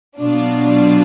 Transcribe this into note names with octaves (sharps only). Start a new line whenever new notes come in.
B2 F#3 D4 F4